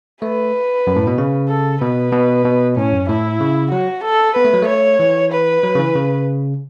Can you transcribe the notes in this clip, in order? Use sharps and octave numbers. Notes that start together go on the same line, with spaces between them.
A3 B4
F#2
A2
B2
C#3
A4
B2 B4
B2
B2
A2 C#4
F#2
A2 E4
C#3
F#3 F#4
A4
B3 B4
A3
F#3
A3
C#5
E3
B4
F#3
C#3
E3
C#3